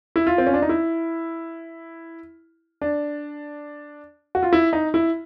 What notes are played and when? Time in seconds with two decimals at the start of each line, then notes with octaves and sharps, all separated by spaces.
0.16 E4
0.27 F4
0.38 C4
0.47 C#4
0.54 D4
0.62 D#4
0.69 E4
2.82 D4
4.35 F#4
4.43 F4
4.53 E4
4.73 D#4
4.94 E4